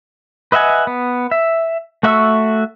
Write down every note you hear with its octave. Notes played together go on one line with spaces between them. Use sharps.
B4 D#5 E5 F#5 G#5
B3
E5
A3 F#4 E5 C#6 E6